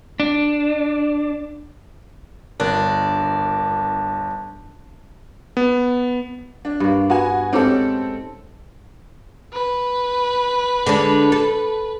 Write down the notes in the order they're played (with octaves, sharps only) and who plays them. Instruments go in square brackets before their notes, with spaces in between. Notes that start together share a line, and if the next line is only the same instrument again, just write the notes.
[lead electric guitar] D4
[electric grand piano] G1 A#4 F#6 [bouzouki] D4
[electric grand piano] B3
[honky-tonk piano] D4
[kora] G2 A#3
[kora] B3 [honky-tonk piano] F#4 G#5
[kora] G#2 C#4 G4 [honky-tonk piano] C4 A4
[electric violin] B4
[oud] D3 G#3 D4
A4